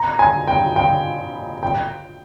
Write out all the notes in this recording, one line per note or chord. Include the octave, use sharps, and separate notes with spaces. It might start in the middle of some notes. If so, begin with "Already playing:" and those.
Already playing: A#5
G#5
G5
G5
G5